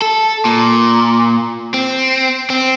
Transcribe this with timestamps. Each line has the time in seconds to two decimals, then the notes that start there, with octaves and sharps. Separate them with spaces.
0.02 A4
0.45 A#2
1.74 C4
2.50 C4